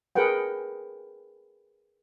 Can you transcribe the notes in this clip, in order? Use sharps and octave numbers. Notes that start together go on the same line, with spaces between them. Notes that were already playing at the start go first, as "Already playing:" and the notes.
G#4 A#4 B4 F#5 G5